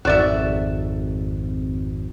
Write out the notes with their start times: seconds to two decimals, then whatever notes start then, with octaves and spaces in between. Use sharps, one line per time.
0.05 G#1 F2 F#4 D5 E5